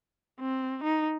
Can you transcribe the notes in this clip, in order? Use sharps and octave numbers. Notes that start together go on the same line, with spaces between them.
C4
D#4